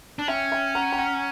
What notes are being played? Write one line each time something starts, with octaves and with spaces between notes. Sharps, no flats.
D4
C#4 E5 G5
E5 G5
F#5 A#5
G5
F#5 A#5